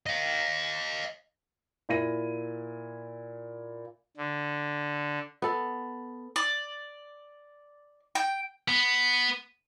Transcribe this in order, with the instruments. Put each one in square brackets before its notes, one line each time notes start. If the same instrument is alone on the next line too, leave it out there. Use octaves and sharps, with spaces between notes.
[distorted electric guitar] D#5 F5
[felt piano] A#2 E4 A#6 D#7
[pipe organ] D3
[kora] B3 A4
[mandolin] D5
G5
[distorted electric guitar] B3